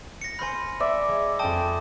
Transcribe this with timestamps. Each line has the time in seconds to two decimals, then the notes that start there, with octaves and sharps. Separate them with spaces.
0.21 A#6 C#7
0.39 C5 G#5 B5 F6
0.80 D5 E5
1.09 G#3
1.39 F2 G5 A5 D#6